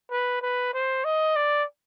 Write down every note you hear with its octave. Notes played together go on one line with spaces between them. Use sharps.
B4
B4
C5
D#5
D5